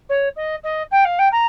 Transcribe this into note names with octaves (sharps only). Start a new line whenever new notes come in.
C#5
D#5
D#5
G5
F5
G5
A#5